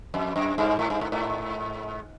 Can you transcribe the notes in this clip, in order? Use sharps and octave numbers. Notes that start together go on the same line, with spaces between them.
F2
F#2
G2
G#2
G2
G#2
G#2